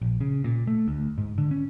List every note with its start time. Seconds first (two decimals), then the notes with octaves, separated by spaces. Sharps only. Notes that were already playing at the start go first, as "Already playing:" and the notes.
0.02 A#1
0.21 C#3
0.44 A#2
0.67 A3
0.88 D2
1.18 G#2
1.38 D3
1.51 C#4